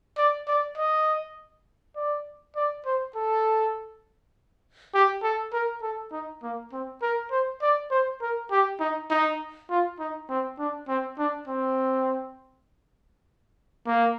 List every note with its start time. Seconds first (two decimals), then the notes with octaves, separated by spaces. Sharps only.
0.18 D5
0.48 D5
0.78 D#5
1.96 D5
2.56 D5
2.86 C5
3.16 A4
4.94 G4
5.23 A4
5.53 A#4
5.82 A4
6.12 D#4
6.43 A#3
6.73 C4
7.02 A#4
7.31 C5
7.62 D5
7.91 C5
8.21 A#4
8.51 G4
8.80 D#4
9.11 D#4
9.70 F4
9.99 D#4
10.30 C4
10.59 D4
10.88 C4
11.19 D4
11.48 C4
13.87 A#3